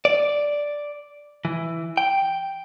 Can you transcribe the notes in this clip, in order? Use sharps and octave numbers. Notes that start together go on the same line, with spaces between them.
D5
E3
G5